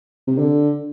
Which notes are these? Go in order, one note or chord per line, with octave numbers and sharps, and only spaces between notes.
C3
D3